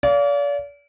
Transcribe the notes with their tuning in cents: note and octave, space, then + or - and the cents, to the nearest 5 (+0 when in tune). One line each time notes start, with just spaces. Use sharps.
D5 -40 F5 +0